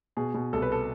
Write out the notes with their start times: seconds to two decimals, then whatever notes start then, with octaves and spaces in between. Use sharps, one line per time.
0.17 B2 G#4
0.34 B2
0.53 C2 A4
0.62 B4
0.72 A4